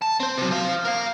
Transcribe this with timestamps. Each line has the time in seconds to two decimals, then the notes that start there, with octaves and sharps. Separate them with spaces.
0.02 A5
0.20 C4 C5
0.38 C3 F#3
0.52 C5 F5
0.85 A#4 F5